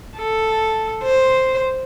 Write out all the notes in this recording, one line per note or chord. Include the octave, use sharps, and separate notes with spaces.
A4
C5